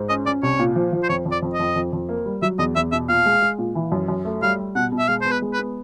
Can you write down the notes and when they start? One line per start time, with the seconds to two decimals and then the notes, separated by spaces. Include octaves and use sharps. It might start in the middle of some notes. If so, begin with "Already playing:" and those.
Already playing: G#2
0.09 C#4 D#5
0.26 C#4 D5
0.43 C2 C#5
0.59 A#2
0.76 F3
0.93 F3
1.03 C5
1.09 F2 C#5
1.26 F2
1.31 D5
1.42 F2
1.53 D#5
1.60 F2
1.76 F2
1.93 F2
2.09 A#3
2.26 G3
2.42 F#3 E5
2.58 E2 D#5
2.75 E2 E5
2.92 B2 E5
3.09 A#2 F5
3.26 G#3
3.42 G#3
3.58 A#2
3.75 E3
3.92 F#2
4.08 F#2
4.25 A3
4.42 G3 F5
4.59 G3
4.75 B2 F#5
4.92 B2
4.99 E5
5.08 G#3 F5
5.21 B3 C5
5.31 B4
5.42 G#3
5.53 B4
5.58 B3